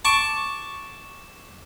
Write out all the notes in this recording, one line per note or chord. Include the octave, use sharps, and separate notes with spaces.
A5 C#6 D6